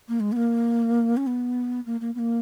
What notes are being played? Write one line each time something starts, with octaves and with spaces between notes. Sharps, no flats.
A#3
G#3
B3
A#3
C#4
B3
A#3
A#3
B3
A#3